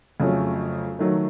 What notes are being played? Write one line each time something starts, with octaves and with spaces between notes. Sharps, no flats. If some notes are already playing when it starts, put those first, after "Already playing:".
F2 C#3 F#3 A3 C#4
D#3 F#3 A3